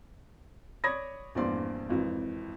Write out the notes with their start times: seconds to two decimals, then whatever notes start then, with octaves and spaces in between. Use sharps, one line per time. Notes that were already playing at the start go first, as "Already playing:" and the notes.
0.84 C#5 D5 B5 D#6 G#6 A#6
1.35 A#1 E2 G2 C4 D5 C6
1.89 G#1 F2 E3